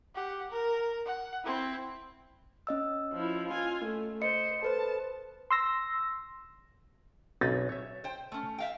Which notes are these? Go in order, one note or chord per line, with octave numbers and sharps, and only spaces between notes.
G4 F#5
A#4
F#5
C4 E4
C#4 D#5 E6
F3 E4
F4 G#5
A3
C5 D#5 C#7
A4 B4 C5 A5
C6 E6 A#6
B1 C#4 A6
C#5 E5
C5 G5
A3 C#4
E5 F5 G5